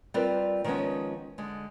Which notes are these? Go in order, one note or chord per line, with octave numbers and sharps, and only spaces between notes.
G3 C4 F4 A#4 B4 D5
D#3 F3 G#3 B3 C#4
D3 G#3